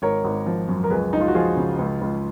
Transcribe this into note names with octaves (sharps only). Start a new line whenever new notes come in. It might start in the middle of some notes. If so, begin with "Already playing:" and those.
G#1 A#4 C#5
G#1
F3
F#2
A#4
C#2 G#4 B4
C#2 D#4
F4
F#4
F3 F4 G#4
C#3
C#2
C#2